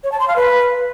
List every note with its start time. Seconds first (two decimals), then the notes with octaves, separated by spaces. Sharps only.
0.04 C#5
0.12 A5
0.20 C6
0.28 F5
0.36 B4